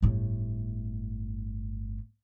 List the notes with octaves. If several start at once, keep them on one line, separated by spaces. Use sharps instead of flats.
G1 A2